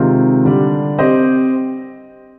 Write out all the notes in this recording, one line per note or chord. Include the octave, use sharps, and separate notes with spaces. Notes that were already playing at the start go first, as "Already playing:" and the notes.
Already playing: C3 D#3 G#3 C4 F4
D3 G3 D4
C4 G4 C5 D#5